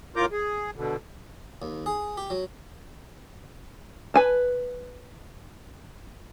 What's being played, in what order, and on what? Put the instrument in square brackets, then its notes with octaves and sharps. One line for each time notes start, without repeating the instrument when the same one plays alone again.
[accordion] A2 F4 A#4 A#5 D6 G6
G#4
B2 D3
[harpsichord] D#2
G#4
G4
F#3
[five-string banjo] B4 G#5 A5